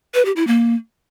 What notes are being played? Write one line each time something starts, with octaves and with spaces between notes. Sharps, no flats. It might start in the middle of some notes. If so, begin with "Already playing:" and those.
B4
G4
E4
A#3